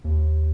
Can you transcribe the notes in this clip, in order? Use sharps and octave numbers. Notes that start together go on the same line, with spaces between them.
D#2